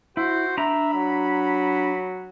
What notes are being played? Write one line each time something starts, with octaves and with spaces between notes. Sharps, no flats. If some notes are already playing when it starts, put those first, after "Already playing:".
E4 F#4 C5
D4 E5 A#5 B5
F#3